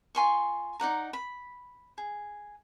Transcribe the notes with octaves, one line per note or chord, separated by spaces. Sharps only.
F4 G#5 C6 C#6
D#4 D5 F#5 A#5
B5
G#4